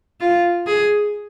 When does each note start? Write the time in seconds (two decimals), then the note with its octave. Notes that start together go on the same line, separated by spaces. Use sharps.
0.21 F4
0.67 G#4